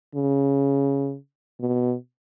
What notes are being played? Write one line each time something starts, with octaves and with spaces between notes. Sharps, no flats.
C#3
B2